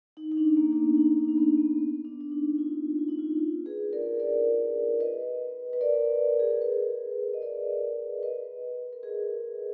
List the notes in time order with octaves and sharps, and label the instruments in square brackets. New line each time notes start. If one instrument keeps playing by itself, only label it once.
[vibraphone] D#4
D#4
D4
A#3
D4
B3
D#4
D4
D4
B3
B3
B3
D4
D4
D#4
F4
F4
D#4
F4
F4
G#4 B4
A#4 D5
A#4 D5
B4 D#5
B4
A#4 D5
G#4
A#4
G#4 B4
D#5
A#4 D5
B4 D#5
A#4
G#4 B4